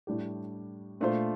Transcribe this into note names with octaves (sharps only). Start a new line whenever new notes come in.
A2 G3 D4 G4
A#2 A3 D4 F4 C5